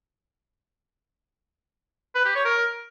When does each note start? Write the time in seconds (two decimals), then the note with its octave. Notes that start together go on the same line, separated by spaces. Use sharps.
2.15 B4
2.25 G4
2.35 C#5
2.45 A#4